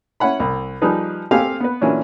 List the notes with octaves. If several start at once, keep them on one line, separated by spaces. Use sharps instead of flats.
C#4 E4 F#5 B5
C2
F3 G3 D#4 G#4 B4
C4 G4 A4 F5 G#5
B3 B4
A#2 E3 F#3 C#4 D4